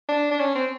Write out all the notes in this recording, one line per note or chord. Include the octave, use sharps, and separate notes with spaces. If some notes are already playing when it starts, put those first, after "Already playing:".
D4
D4
C#4
C4